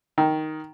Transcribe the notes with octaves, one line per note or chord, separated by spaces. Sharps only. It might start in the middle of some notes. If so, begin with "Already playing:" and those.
D#3